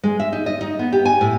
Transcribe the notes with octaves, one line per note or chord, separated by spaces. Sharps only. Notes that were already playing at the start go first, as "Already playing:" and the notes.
G#3
E5
D#4
D#5
D#4
B3
G4
G#5
A2